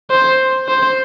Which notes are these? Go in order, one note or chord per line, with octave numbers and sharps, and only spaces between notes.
C5
C5